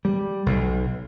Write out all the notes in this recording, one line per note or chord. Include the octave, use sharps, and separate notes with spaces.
G3
B1